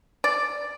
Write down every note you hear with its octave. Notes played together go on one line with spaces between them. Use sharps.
D5